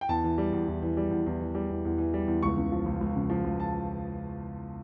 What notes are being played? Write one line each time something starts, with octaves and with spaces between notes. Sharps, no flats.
G5
E2 A5
E3
G3
E2
E2
E3
G3
E2
E2
E3
G3
E2
E2
E3
G3
E2
C#2 C#6
C#3
F3
C#2
C#2
C#3
F3
C#2
A5